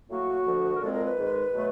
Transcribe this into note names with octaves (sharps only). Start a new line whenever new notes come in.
A2 F#3 A#3 F#4
D2 D3 F3
A#4
A#2 F3 G#3 C4 A4
A#4
B4
G#2 D#3 G#3
B2 F#3 A3